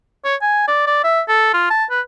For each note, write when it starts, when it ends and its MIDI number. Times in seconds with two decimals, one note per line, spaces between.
0.25 0.35 73
0.42 0.65 80
0.68 0.87 74
0.87 1.01 74
1.04 1.21 76
1.29 1.53 69
1.54 1.66 65
1.70 1.84 81
1.90 2.01 71